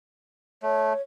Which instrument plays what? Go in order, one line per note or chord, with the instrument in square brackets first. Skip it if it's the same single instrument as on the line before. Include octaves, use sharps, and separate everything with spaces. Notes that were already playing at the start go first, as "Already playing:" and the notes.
[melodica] A3 [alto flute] C#5